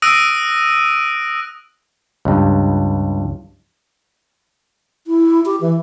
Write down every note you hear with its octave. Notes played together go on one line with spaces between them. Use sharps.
D#6 E6 F#6 A#6 D7 D#7
C#2 G2
E4
G4
E3